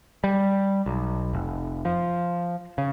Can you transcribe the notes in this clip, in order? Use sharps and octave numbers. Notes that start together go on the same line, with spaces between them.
G3
B1
F1
F3
C#3